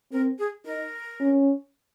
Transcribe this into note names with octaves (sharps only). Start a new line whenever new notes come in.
C4 A#4
G#4
D#4 A#4
C#4